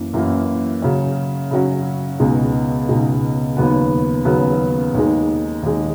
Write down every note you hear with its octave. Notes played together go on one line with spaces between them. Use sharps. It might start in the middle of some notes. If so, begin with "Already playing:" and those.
Already playing: F#2 E3 A#3
F#2 E3 A#3 E4
C#3 F#3 C#4
C#3 F#3 C#4
C#2 B2 G#3 D#4
C#2 B2 G#3 D#4
D#2 C#3 F#3 B3
D#2 C#3 F#3 B3
D#2 D#3 G#3
D#2 D#3 G#3